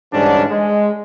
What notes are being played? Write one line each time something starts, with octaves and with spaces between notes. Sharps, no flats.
G#2 D3 E3 G3 C#4 D4
G#3